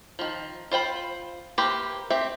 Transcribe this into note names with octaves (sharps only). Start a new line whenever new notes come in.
D#3 F3
F4 C5 G5 B5
A#3 E4 G4 B4 C5
C4 G4 E5